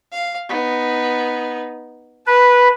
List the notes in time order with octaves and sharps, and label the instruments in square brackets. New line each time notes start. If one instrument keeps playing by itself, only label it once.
[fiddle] F5
B3 D#4
[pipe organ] B4 [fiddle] A5